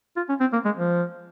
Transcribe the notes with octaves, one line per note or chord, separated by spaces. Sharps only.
F4
C#4
C4
A#3
G#3
F3